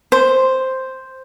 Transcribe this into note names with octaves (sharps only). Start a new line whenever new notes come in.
C5